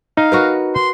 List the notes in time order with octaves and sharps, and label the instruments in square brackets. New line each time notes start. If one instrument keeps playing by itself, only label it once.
[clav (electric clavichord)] D#4 [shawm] F5
[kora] F#4 A#4 B4
[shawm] C6